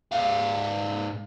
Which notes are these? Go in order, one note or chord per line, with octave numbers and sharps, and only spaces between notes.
G#2 F5